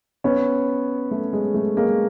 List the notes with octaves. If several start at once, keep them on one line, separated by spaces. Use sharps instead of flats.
B3 C#4
A3
G#3
A3
G#3 A#3